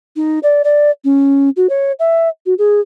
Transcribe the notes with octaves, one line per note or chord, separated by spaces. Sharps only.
D#4
D5
D5
C#4
F#4
C#5
E5
F#4
G#4